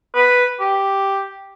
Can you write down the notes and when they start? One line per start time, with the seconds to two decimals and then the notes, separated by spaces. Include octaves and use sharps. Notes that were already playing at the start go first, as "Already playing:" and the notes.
0.15 B4
0.60 G4